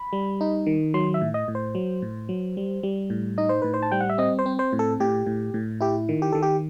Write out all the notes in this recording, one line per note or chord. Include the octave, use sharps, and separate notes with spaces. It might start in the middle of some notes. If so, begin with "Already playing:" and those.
Already playing: B5
G3
D#4
D#3
F#3 C6
E5
A2
D#5
A2
C5
F#3
A2
F#3
G3
G3
A2
D#4 D#5
C5
A2 B4
C5
A5
G3 G5
F#5
E5
C4 D#5
C5
C4
C5
A2
A4
A2 G4
A2
A2
E4 G4
D#3
G4
D#3 A4
G4